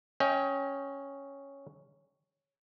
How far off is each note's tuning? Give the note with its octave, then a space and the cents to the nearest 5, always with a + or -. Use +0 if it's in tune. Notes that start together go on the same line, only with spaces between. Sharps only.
C#4 +0 D#5 +35 G5 +0